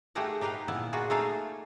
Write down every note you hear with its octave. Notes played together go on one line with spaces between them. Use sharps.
A3 D#4 G4 G#4 A#4 F#5
D#4 G4 A#4 B4 F5
A#2 E3 B3 E4
D#4 F4 F#4 G#4 D5
A3 A#3 D#4 G#4 A4 F5